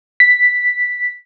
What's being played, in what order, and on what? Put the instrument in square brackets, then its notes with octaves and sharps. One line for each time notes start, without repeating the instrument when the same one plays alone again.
[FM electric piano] B6